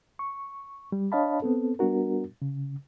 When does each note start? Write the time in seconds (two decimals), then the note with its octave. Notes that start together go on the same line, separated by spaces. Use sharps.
0.19 C#6
0.92 G3
1.12 D4 C#5 D#5 F5 A5 B5
1.42 B3 C4 A4
1.79 G3 B3 D4 F#4 A#4
2.42 C#3